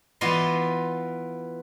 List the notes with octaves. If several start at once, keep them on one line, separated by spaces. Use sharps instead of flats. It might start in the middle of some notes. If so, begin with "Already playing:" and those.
E3 B3 F4 D5 D#5 C6